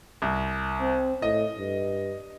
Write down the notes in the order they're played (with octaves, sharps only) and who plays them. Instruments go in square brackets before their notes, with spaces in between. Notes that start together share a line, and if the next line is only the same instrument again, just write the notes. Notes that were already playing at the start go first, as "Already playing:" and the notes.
[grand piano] C2
[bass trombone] C4
[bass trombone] A2 [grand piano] D#5
[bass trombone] G2